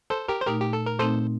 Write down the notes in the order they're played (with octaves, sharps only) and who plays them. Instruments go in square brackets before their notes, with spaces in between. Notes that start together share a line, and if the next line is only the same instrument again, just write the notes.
[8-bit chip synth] A4 C5
G4 A#4
C5
[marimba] A#2 A3 D#4 [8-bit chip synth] G4 A#4
[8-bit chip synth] G4
A4
A#4
[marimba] A#2 A3 C4 D#4 [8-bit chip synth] A4 C5